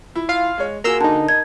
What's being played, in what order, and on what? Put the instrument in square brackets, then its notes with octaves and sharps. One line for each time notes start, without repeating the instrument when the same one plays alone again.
[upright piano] E4
[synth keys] F4 F5
[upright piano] G#3 C#5
[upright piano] A#3 F#4 G#4 [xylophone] A#4 [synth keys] A#5 C6 E6
[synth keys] D3 D#4 [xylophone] A5
[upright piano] D#4 [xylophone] G#6